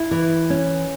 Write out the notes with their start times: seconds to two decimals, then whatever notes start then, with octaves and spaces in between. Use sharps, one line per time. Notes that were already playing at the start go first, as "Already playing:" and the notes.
Already playing: E4
0.11 E3
0.50 C#4